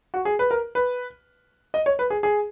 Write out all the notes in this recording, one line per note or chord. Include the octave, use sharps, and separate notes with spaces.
F#4
G#4
B4
A#4
B4
D#5
C#5
B4
G#4
G#4